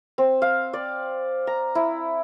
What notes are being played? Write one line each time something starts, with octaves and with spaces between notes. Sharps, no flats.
C4
F5
D5
A#5
E4